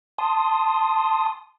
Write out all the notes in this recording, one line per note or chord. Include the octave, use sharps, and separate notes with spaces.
A5 C6 D#6